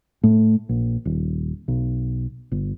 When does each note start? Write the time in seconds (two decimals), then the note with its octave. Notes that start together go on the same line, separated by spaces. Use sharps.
0.23 A2
0.69 A#1
1.05 D#1
1.68 B1
2.52 G1